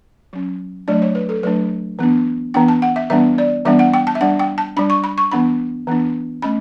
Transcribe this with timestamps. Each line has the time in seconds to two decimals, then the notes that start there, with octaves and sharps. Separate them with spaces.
0.33 F#3 C#4
0.88 F#3 A3 D4 D5
1.02 C#5
1.15 B4
1.29 A4
1.43 F#3 A3 D4 B4
1.99 E3 B3 D4
2.54 E3 B3 D4 G5
2.68 A5
2.82 F#5
2.96 E5
3.10 E3 G3 B3 D4 E5
3.38 D5
3.65 E3 G3 B3 D4 E5
3.79 F#5
3.94 G5
4.07 A5
4.15 E5
4.21 G3 D4 F#5
4.39 G5
4.58 A5
4.77 G3 D4 B5
4.90 C#6
5.04 B5
5.18 C#6
5.32 E3 B3 D4 B5
5.87 E3 B3 D4
6.42 A3 C#4 B5